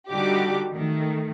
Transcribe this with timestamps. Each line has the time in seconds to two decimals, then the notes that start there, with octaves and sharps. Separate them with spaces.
0.10 D3 G3 D#4 F#4 G4 D6
0.73 D#3 A3